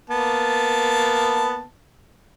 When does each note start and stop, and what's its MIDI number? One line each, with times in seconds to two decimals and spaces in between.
0.10 1.64 58
0.10 1.64 59
0.10 1.64 81